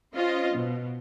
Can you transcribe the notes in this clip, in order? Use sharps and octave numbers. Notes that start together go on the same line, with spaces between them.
C#4 F4 C5 D#5
B2